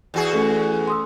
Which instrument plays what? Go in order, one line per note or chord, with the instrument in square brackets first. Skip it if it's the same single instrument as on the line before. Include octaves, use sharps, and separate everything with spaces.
[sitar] E2 F#4 G#4
[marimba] A3 C#4 A4
C6 D#6 E6